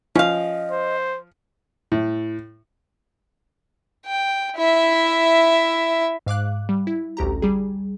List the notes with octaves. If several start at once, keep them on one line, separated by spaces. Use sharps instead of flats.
F3 C#4 D#5 F5
C5
A2
G5
E4 E5
G#2 F5 D6 F#6
G3
E4
A1 D2 G4 A#5
G3 G#4